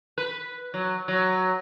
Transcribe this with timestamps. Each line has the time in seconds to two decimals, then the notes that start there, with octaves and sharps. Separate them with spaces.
0.18 B4
0.74 F#3
1.08 F#3